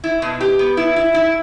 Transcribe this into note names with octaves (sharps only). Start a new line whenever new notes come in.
E4
B2
G4
B3
E4
E4
E4